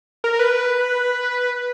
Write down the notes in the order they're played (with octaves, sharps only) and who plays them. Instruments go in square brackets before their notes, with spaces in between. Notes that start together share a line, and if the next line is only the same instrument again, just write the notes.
[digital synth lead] A#4
B4